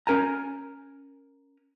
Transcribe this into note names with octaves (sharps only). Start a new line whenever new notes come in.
C#4 A#4 G#5 A#5